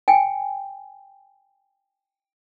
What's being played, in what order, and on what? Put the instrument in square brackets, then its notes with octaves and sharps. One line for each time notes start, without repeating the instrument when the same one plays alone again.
[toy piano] G5 G#5